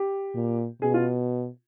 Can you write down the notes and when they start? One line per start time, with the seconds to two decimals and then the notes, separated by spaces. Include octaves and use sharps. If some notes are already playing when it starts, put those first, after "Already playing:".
Already playing: G4
0.35 A#2
0.82 B2 G#4
0.94 F4